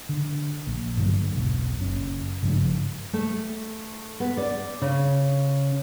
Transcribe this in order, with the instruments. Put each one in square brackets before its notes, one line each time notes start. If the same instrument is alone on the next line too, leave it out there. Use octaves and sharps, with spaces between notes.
[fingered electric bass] D3
A#1
G2 D3 F#3
E1 B1
F#1 C#4
G#1 G2 C#3 F3
[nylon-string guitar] A3
B3
D5
C#3